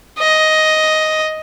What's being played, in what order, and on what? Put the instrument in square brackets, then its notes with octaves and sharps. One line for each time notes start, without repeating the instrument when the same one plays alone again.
[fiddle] D#5